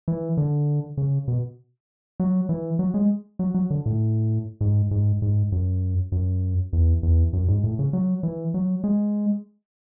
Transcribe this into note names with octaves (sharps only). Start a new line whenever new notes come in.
E3
D3
C#3
B2
F#3
E3
F#3
G#3
F#3
F#3
D3
A2
G#2
G#2
G#2
F#2
F#2
E2
E2
F#2
G#2
A2
C#3
F#3
E3
F#3
G#3